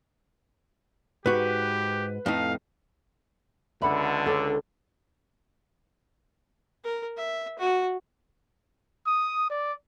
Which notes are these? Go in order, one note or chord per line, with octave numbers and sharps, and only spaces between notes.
G#2 F#4 G4 B4
F2 A2 D#4 F5
C#2 D3 B4 D5 E5 F#5 B5
D4 A4 C#5 D5
A#4
E5
F#4
D#6
D5